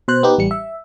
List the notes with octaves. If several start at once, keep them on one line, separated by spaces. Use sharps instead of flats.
B2 C5 F#6
B3 D#4 G4
A1 G3 C#7
E5